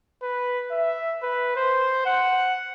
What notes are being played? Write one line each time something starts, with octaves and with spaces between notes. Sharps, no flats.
B4
E5
B4
C5
F#5